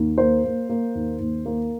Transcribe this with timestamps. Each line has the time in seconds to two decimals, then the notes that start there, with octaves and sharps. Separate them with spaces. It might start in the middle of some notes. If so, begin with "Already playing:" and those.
Already playing: D#2
0.18 A#3 C5
0.44 A#3
0.69 A#3
0.95 D#2
1.20 D#2
1.46 A#3